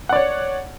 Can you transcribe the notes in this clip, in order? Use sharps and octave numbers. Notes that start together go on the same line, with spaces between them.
C#5 D5 F#5